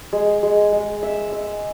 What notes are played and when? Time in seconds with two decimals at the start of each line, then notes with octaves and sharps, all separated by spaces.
0.13 G#3
0.43 G#3
0.72 G#3
1.03 E5
1.32 E5